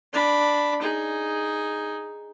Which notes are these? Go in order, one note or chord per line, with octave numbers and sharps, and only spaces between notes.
D4 B5
D#4 G#4